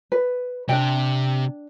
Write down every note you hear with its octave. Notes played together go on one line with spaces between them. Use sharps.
B4
C3 D4 G5